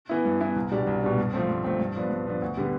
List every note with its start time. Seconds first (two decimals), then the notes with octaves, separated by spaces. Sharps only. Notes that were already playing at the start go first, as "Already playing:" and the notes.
0.09 E3 B3 E4
0.25 G2
0.40 E3 B3 E4
0.56 C2
0.72 B2 G3 D4
0.87 C2
1.02 B2 G3 D4
1.18 G2
1.33 F3 A3 C4
1.49 G2
1.64 F3 A3 C4
1.80 G2
1.96 F3 B3 D4
2.10 G2
2.26 F3 B3 D4
2.42 D2
2.57 D3 G3 B3